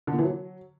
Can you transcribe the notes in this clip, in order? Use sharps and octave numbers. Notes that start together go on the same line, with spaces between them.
D3
A#2
E3
F#3